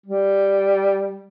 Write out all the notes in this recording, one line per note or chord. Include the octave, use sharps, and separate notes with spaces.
G3